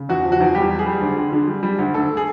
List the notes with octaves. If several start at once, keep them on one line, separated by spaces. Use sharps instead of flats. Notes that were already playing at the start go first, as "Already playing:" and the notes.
Already playing: C#3
E2 F#4
F3
F#4
E2
G3 G4
G3
G#4
G3
D2
D3
D3
G3
G3
D2
D2 A4
G#4